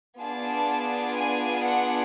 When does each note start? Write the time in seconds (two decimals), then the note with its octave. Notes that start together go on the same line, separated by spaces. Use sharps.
0.20 B3 D4 F4 G#4 A5
1.16 G#5
1.62 F#5